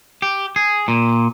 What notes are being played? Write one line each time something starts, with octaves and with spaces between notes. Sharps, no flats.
G4
G#4
A#2